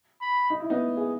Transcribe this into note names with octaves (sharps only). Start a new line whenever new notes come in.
B5
D#4
E4
B3 D#4
G#4